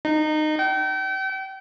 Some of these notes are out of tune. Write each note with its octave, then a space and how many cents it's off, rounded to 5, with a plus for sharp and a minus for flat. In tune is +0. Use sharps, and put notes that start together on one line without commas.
D#4 -20
G5 -35